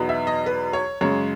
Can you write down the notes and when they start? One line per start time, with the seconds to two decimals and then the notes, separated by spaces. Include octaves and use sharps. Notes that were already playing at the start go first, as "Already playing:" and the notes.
Already playing: E2 B2 F#3 B3 D#4
0.09 E5
0.27 D#5
0.46 B4
0.73 C#5
1.01 F#2 C#3 G#3 C#5